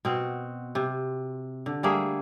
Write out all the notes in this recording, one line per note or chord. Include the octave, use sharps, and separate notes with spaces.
B2 C4 F#4
C3
D3
G3 A3 A#3 G#4